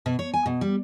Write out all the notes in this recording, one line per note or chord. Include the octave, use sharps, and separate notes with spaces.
B2
C#5
G#5
B2
G3